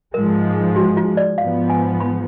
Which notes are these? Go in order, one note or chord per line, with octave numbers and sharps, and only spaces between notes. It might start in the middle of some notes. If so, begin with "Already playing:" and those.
G#2 F3 G#3 A#4
F#4
F4
D5
G#2 F3 B3 F5
G#5
B5